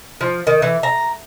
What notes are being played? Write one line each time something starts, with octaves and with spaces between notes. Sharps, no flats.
F3
D#3
E3
A#5